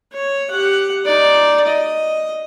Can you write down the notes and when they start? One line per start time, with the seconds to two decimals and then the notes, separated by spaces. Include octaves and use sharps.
0.13 C#5
0.50 G4 F#5
1.05 D#4 D5
1.67 D#5